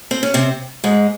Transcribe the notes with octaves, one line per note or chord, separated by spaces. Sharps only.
C4
C#4
C3 C4
G#2 G#3